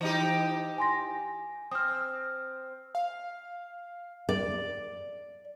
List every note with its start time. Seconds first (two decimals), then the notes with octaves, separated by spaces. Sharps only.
0.01 E3 D#4 G4
0.78 G#5 C6 A#6
1.71 C4 D#6 F6
2.95 F5
4.29 D5